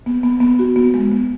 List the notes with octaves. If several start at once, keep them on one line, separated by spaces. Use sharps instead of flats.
B3
B3
B3
F#4
B3
G#3
B3